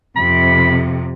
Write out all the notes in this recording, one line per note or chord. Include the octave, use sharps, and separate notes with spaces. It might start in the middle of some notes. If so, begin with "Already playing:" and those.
F2 C3 B5